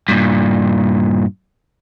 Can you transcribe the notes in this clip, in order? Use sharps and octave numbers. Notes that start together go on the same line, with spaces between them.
G2 A#2